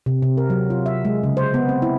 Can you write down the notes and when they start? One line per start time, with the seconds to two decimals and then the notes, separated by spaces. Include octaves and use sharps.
0.06 C3
0.23 C3
0.37 A#4
0.50 F#3
0.70 F4
0.86 E5
1.05 G#3
1.24 C#3
1.37 C5
1.54 B3
1.69 C4
1.82 E4